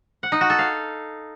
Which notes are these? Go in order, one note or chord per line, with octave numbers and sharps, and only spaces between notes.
F#5
D#4
F#4
A4
F5